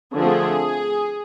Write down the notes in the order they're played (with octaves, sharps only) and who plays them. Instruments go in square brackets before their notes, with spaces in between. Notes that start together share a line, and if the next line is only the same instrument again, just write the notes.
[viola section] D3 F3 A3 C4 G#4